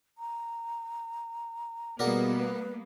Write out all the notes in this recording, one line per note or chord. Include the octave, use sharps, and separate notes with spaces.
A#5
B2 G3 A#3 B3 G#4 A#4 D5 F#5
B4